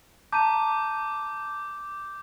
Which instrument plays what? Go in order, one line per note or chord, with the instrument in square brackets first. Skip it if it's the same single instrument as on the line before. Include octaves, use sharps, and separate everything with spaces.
[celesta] A5 A#5 D#7 [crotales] D6 G6